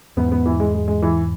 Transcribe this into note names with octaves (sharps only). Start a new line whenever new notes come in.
E2 G#2 B3
B3
E3
G#3
G#3
G#3
E3